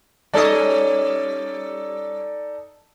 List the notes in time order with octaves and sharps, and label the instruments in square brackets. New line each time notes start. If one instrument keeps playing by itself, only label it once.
[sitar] G3 C#4 D#5 [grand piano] D#4 A4 D5